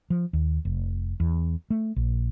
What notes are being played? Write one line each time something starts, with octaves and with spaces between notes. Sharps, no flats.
F3
D#2
F1
E2
A3
A#1